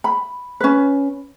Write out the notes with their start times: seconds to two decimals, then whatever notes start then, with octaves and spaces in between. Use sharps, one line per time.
0.04 B5
0.60 C#4 B4